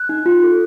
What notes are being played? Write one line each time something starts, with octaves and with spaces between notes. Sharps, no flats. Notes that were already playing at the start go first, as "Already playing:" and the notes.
Already playing: F#6
D#4
F4
A4